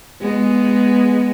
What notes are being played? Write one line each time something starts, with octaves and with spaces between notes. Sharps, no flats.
G#3 B3